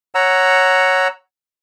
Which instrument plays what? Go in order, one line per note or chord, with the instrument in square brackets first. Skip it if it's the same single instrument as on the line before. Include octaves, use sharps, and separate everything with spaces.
[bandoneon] C#5 F#5 A#5 E6